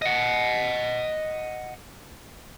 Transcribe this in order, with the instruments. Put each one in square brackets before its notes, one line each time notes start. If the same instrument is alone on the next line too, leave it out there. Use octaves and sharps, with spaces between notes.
[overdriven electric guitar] D#5 F#5